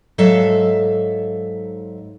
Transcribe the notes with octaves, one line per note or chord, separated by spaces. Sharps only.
G#2 F#3 A4 E5 F5